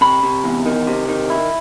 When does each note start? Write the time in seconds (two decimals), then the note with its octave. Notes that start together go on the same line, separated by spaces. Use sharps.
0.01 C3 B5
0.23 C3
0.44 E2
0.66 D#3
0.87 C3
1.08 D#3
1.30 E4